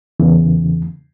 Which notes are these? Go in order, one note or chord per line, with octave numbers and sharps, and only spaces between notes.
E2 C#3 E3